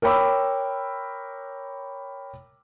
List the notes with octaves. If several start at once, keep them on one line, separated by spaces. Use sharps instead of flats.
A#4 C#5 G5 B5 D6 E6